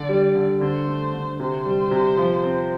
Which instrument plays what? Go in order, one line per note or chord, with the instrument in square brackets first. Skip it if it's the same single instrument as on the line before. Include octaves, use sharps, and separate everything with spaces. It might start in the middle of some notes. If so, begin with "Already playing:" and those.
Already playing: [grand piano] D3 [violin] D5
[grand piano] G3
D3
[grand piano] D3 [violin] C5
[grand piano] A3
D3
[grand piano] C3 [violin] C5
[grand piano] G3
C3
F3
C4